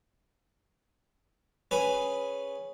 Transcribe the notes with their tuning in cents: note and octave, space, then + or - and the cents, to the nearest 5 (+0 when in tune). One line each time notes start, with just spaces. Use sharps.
C#4 +0 G#4 +0 B4 +0